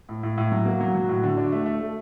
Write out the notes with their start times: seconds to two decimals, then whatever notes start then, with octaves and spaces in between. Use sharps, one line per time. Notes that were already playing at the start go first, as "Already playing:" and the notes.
0.09 A2
0.23 A2
0.38 A2
0.52 F#3
0.65 A#3 F#4
0.81 F#3
0.94 F#3
1.09 A2
1.23 D3
1.37 D4
1.52 A3
1.66 A3
1.80 A3